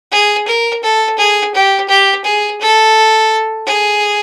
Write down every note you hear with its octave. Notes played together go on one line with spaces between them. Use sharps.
G#4
A#4
A4
G#4
G4
G4
G#4
A4
G#4